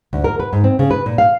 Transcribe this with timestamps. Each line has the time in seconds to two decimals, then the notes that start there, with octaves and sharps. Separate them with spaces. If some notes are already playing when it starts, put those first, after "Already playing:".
0.13 D2
0.24 A#4
0.40 B4
0.53 G#2
0.64 C4
0.79 C#3
0.91 B4
1.06 A#2
1.18 F5